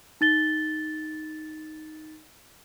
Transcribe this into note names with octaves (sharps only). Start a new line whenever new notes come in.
D#4 A6 G7